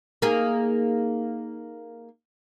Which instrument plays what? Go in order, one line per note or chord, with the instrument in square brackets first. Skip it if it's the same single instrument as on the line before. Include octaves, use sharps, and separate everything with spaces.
[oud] A#3 D#4 G#4